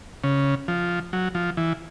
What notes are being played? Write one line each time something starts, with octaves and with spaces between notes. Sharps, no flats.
C#3
F3
F#3
F3
E3